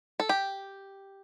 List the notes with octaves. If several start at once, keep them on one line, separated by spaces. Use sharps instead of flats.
A4
G4